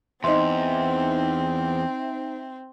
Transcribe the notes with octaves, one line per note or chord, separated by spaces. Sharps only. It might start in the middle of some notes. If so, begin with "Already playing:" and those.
E2 C4 D#4 C5 D#5 E5 C6